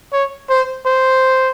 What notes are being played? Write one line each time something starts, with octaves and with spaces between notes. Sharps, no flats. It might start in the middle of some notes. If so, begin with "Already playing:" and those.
C#5
C5
C5